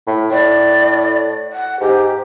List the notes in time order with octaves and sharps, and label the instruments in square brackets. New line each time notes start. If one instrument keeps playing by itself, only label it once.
[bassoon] A2
[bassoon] A2 [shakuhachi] D5
[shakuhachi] F#5
[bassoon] G#2 [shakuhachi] G4